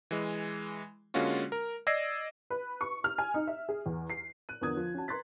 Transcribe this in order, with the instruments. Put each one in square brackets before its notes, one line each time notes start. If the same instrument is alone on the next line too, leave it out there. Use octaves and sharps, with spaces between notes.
[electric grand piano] E3 G#3
D3 G#3 A#3 C#4 F4 F#4
A#4
D5 D#5 E6 G#6 A#6 C7
[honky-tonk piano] B4
C#6
F6
G#5
D#4
E5
G#4
E2
C7
[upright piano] F#6 D#7
E2 D3 F3 A#4 D#6 G#6
F3
C#4 F#4 A5
B4 A#5 C6 F#6 A6 B6